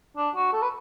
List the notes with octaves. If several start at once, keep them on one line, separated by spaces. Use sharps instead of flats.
D4
F#4
A4
B4